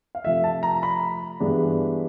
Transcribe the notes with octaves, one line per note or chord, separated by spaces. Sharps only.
F5
C3 F3 A3 E5
A5
A#5
B5
G2 E3 G#3 B3 D4